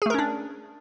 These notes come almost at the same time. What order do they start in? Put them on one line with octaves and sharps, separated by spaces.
G#4 A3 A#4 C#4 D4